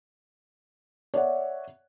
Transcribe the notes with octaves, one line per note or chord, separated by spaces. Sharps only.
C#5 D5 E5 F#5